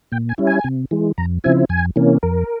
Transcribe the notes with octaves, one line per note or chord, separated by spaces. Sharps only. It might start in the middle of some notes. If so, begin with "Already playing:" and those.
A#2 G5
G#5
G3 C#4 E4
G#5
C3
E3 G#3
F2 A#5
C#3 F3 C4 E4 G#5
F2 G#5
C3 E3 A#3 C#4
F2 A#4